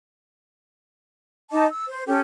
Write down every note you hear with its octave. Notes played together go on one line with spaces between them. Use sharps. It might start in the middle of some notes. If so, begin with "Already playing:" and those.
D#4 D#5 A5 D6
E6
C5
C#4 G4 A4